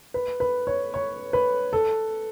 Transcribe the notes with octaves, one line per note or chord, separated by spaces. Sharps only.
B4
B4
C#5
C#5
B4
A4